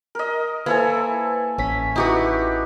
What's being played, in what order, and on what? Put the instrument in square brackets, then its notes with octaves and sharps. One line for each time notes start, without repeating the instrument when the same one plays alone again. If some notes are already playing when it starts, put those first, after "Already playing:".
[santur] A#4 D#5
[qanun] A#3 [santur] E4 A4 G#5 [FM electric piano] B4 C5
[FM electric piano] A1 B6 [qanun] C#4
[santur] D#4 G4 C#6 [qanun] E4 F#4 B4